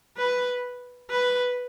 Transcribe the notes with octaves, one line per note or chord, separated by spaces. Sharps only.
B4
B4